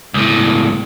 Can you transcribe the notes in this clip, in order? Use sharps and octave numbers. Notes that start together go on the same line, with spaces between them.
C#2 A2